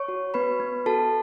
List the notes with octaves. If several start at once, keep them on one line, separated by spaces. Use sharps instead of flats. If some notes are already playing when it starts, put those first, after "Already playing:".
Already playing: C#5 C#6
F#4
B3 B4 B5
B3
F#4 A4 A5